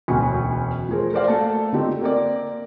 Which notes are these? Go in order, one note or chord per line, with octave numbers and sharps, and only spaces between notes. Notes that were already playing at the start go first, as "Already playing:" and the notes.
E1 D2 B2 F#3 C#4 C#6
F3 A3 G#4 A#4 C5
A#4 C5 D5 F5
A3 A#3 F#4 A4 A5
D3 A3 C4 D#4 F4 G4
A#3 C4 A#4 D5